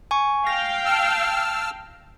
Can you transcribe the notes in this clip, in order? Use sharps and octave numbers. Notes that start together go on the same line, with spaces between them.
G#5 C#6
F5 G5 A#6
A5 E6 F6